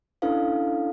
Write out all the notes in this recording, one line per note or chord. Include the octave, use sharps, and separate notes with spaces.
C#4 D4 E4 A4 B4 F5